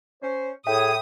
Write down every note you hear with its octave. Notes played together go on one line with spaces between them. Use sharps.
C#4 C5
A2 G#4 A4 C#5 E5 G5 D#6